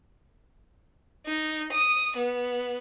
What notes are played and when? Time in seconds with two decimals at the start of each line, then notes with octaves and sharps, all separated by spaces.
1.26 D#4
1.72 D#6
2.17 B3